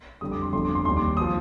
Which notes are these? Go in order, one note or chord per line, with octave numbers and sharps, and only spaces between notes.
F2 D3 G3 D#6
D6
C6
G1 F2 D3 C6
D6
C6
D#2 D#3 G3 C6
D6
F3 D#6